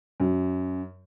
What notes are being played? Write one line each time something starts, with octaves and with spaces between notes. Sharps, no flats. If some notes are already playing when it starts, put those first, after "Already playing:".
F#2